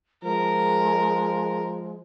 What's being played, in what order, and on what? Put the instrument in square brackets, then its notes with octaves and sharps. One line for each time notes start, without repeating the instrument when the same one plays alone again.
[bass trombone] F3 [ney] G#3 [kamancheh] A#4